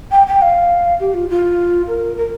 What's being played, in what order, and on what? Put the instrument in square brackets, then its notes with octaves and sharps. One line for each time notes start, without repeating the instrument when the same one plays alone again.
[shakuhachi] G5
G5
F5
G4
F4
F4
A#4
A#4